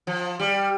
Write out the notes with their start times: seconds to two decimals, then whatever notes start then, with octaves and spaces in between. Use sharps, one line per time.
0.07 F3
0.40 G3